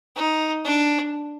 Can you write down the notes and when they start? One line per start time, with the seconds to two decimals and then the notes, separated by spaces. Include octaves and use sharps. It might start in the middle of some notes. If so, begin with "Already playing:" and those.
0.16 D#4
0.65 D4